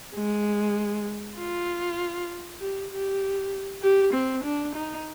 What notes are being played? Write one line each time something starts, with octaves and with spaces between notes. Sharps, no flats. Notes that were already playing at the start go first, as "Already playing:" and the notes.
G#3
F4
G4
G4
G4
C4
D4
D#4